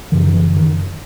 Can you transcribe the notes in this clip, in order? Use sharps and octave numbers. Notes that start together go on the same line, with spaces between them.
F#2 C#3 E3
D#3
E3
D#3